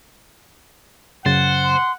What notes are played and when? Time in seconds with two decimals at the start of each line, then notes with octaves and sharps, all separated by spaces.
1.26 F#2 C#3 C5 F#5 A6
1.64 C6